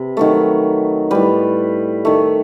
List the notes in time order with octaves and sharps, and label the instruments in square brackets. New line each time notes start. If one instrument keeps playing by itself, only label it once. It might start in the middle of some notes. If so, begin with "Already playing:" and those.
Already playing: [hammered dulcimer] C3 B4
D#3 F#3 A3
A2 G3 B4
D#3 A3